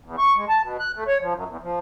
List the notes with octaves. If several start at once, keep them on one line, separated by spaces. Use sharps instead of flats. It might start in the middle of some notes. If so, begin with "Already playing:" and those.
E2
C#6
G#3
A5
B2
F#6
A3
C#5
F3
F#2
E2
F3